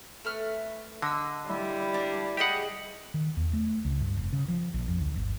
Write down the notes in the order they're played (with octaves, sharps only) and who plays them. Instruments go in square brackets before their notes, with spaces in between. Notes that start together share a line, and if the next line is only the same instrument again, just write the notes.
[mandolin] A3 B4 F6
[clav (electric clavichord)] D3 [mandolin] D#5 E6
[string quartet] G3 [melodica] E4
[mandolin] D4
[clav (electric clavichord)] G4 F#5 [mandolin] G#4 D#5 G5
[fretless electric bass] D#3
E2
A3
C#2
G2
F1
C#3
F3
A#1
F2
D2
G1